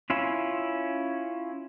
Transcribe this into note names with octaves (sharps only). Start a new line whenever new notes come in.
C#4 E4 F4